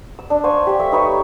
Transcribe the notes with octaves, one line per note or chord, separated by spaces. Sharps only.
E6
D4
C5 F5 G#5 C#6
G4 G5
A3 E5 C#6
D#4 B4 C#5 E5